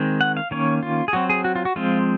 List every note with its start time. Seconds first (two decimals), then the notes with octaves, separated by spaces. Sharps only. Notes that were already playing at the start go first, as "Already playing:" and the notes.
Already playing: D#3 G#3 C4
0.21 F#5
0.37 F5
0.51 D#3 A#3 C#4 C#5
0.83 F4
1.08 G#4
1.13 F#3 C4 F#4
1.30 G#4
1.44 F#4
1.56 F4
1.65 F#4
1.76 F3 G#3 C4 F4